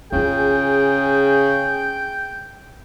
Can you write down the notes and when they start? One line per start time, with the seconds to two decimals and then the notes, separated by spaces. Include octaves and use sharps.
0.12 C#3 D#4 F4 G#4 G5